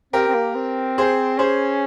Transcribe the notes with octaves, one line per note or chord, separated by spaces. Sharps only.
C4 G4 A#4
C4
A#3
C4
G#4 C5
C#4 G#4 C5